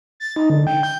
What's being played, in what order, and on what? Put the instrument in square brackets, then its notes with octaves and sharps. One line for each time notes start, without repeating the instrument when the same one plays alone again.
[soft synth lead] A6
D#4
D3
G5
G6